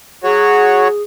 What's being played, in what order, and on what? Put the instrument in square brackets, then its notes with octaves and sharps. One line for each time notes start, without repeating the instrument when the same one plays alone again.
[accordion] F#3 F#4 C#5 [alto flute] G#4